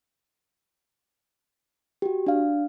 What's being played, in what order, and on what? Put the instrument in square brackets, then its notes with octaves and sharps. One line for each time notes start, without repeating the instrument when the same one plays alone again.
[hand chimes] F#4 G4
D4 F5